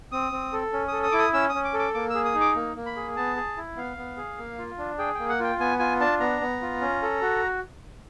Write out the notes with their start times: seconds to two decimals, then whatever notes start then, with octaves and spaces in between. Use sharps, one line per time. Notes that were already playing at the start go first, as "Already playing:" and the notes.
0.12 C4 D#6
0.32 C4
0.53 A4
0.73 C#4
0.88 A4 D#6
1.03 D#6
1.11 E4 D6
1.18 D#6
1.33 C#4 E6
1.49 D#6
1.54 C#4
1.64 D6
1.73 A4
1.79 D6
1.94 A#3 D6
2.10 G#4 E6
2.25 D#6
2.34 D#4
2.41 D6
2.55 A#3
2.76 A#3
2.86 B5
2.96 G#4
3.16 B3 A5
3.36 G#4
3.57 E4
3.76 B3 F5
3.97 B3
4.17 G#4
4.38 A#3
4.59 F4
4.78 D4
4.99 G#4 G5
5.14 A#3 G5
5.29 F#5
5.40 F4 G5
5.60 B3 G#5
5.79 F4 G#5
6.00 D4 A5
6.20 B3 A#5
6.41 B3
6.62 F4
6.81 C#4
7.02 A4
7.21 F#4